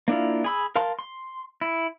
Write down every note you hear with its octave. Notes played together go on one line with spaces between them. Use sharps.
A#3 D4 E4 F4
G#4 B5 E6
A#4 F5 A5 C6
C6
E4